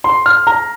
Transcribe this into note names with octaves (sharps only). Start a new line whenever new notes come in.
C6
F6
A#5